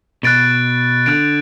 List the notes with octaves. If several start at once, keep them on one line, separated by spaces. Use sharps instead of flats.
B2 F#6 A6 D7
D3 F#6 A6 D7